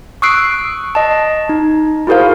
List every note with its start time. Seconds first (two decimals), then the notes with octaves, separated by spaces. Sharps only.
0.22 C#6 D#6 E6 F#6 C7 D7
0.95 D#5 A5
1.49 D#4
2.07 E4 F#4 G#4 A#4 C5 F5